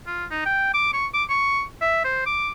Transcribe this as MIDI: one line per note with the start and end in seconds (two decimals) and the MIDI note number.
0.07 0.25 65
0.31 0.41 63
0.45 0.71 79
0.74 0.93 86
0.93 1.06 85
1.14 1.24 86
1.29 1.63 85
1.81 2.02 76
2.04 2.21 72
2.26 2.51 86